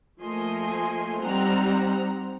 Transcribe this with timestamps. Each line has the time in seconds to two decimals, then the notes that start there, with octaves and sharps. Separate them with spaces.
0.21 F3 A3 A#3 D#5 G#5 C6
1.21 G3 C4 D#4 F#5 A#5